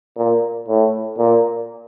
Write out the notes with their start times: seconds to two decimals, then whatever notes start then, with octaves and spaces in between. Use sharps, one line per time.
0.17 A#2
0.68 A2
1.18 A#2